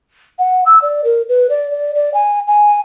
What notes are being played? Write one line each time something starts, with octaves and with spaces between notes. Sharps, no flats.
F#5
E6
D5
A#4
B4
D5
D5
D5
G#5
G#5